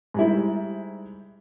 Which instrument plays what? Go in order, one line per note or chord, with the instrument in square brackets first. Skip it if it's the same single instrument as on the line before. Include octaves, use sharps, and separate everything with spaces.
[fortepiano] G#2 G3 E4